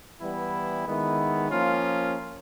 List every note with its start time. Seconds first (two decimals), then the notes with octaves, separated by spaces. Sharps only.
0.20 E3 G3 B3 E4
0.85 D#3 G#3 B3 E4
1.50 F3 A#3 C#4 F4